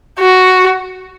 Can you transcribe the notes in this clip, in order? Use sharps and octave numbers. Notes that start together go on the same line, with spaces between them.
F#4